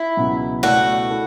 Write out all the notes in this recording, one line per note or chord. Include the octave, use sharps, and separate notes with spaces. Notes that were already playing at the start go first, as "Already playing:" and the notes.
Already playing: E4
C#2 B2 F#3
B2 A3 E4 F#4 A4 D5
E4 A4